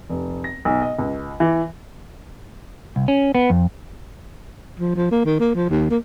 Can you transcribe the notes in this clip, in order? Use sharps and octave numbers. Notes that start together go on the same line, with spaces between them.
F1
A#6
B1
D#5
C#2
E3
C2
C#4
B3
F2
F3
F3
A#3
D#3
A#3
F3
D#2
A#3